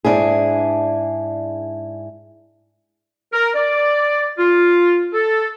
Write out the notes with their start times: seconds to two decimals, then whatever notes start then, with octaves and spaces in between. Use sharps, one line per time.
0.05 G#2 D4 E4 G#4
3.33 A#4
3.55 D5
4.39 F4
5.13 A4